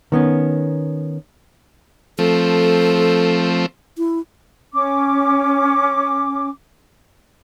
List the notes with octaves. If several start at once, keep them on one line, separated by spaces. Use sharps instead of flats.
D#3 B3 C#4
F3 A3 C4 A4
E4
C#4 D6